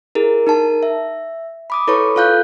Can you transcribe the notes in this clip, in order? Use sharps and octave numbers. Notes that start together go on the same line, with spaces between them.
E4 G#4 A#4
D#4 A#4 A5
E5
B5 D6 D#6
E4 A4 B4 C#5 B5 C#6
F4 A4 F5 F#6 G6